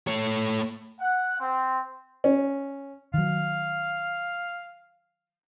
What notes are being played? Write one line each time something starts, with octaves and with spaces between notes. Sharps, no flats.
A3 C#5
F#5
C4
C#4
D#3 F#3 F5